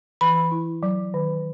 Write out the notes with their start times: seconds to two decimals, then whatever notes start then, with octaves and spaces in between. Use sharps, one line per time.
0.21 E3 B5
0.51 E4
0.83 F#3
1.14 D#3